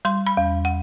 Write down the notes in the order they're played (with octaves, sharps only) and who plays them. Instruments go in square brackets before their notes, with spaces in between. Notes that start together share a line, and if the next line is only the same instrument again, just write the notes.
[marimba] G3 C6
B5
E2
F#5